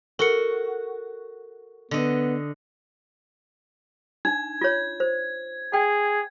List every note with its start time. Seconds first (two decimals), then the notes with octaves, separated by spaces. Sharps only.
0.19 F#4 A4 A#4 C#7
1.91 D3 B3 D#5
4.25 D4 D#4 G#6
4.61 F4 C#5
5.00 C5
5.73 G#4 G5